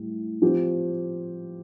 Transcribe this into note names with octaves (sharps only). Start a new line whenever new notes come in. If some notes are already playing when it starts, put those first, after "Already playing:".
Already playing: A2 G3
F3 C4 G4